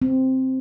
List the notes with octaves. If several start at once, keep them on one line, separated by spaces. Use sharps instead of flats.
C4